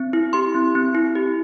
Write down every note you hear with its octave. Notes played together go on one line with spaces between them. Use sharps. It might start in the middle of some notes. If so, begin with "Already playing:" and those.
Already playing: C4
E4
G4 C6
C4
C4
E4
G4